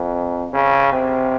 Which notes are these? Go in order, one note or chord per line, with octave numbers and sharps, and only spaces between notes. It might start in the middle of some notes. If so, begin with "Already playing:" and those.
Already playing: F2
C#3
C3